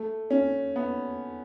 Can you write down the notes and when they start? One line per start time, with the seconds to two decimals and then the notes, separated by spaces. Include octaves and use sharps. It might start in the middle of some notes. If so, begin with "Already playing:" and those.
Already playing: A3
0.30 C#4
0.76 B3